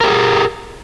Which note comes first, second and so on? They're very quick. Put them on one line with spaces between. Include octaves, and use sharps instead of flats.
A#4 G4 G#4